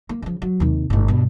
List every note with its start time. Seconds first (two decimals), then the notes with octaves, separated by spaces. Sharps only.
0.09 A#3
0.22 C#3 F3
0.42 F#3
0.60 D#2 C3
0.90 G1 A2
1.08 G2 B2